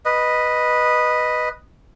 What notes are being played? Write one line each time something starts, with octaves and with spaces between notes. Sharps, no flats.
B4 D#5